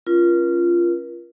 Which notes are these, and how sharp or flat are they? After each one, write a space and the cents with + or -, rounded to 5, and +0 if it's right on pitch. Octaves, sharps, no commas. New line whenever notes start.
C#4 +0 F4 -15 A#4 +35